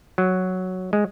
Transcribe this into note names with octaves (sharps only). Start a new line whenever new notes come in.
F#3
G#3